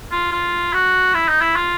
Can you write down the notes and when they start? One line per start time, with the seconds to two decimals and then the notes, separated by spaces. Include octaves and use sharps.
0.12 F4
0.32 F4
0.73 F#4
1.14 E4
1.29 D#4
1.41 E4
1.56 F4